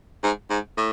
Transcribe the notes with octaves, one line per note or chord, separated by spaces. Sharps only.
G#2
G#2
A2